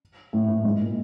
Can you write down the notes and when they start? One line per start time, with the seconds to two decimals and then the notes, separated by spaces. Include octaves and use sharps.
0.33 A2
0.48 A2
0.64 G#2
0.80 A#2